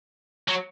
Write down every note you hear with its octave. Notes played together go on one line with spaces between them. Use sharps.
F#3